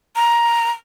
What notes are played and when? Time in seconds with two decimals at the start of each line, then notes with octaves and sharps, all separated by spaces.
0.16 A#5